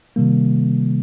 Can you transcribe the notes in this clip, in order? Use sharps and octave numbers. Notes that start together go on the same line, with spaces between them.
C3 D#3 G3 A#3